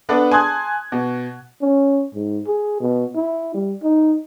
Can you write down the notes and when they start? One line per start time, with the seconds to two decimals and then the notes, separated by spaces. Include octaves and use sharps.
0.09 B3 D4 A4 B4 D5
0.31 G#5 A5 C6 D#6 F#6 G#6
0.92 B2
1.62 C#4
2.15 G#2
2.46 G#4
2.80 B2
3.15 E4
3.54 G3
3.83 D#4